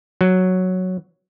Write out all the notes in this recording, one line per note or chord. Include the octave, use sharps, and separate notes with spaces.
F#3